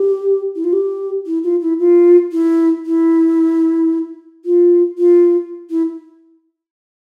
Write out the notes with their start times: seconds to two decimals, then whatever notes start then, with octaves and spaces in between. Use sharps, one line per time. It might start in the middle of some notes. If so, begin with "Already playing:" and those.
Already playing: G4
0.55 E4
0.64 F4
0.72 G4
1.25 E4
1.43 F4
1.60 E4
1.79 F4
2.31 E4
2.85 E4
4.45 F4
4.98 F4
5.70 E4